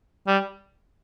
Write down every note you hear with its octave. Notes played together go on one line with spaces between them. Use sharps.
G3